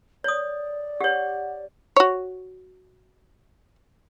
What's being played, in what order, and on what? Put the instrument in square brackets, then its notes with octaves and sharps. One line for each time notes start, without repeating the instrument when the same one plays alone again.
[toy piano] C#5 D#6 [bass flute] D5
[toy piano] G4 C#5 [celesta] F#5
[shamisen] F#4 C#5